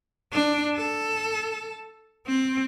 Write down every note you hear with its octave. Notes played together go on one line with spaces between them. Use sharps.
D4
A4
C4